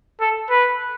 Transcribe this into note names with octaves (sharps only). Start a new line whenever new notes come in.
A4
B4